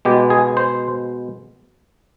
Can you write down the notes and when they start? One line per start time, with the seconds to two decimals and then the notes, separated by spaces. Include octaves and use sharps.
0.05 B2 G#3 B3 G4
0.30 G#4
0.57 C5